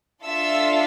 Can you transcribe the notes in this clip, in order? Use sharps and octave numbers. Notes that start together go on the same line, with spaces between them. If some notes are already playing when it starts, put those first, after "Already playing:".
D4 F4 A4 E5 E6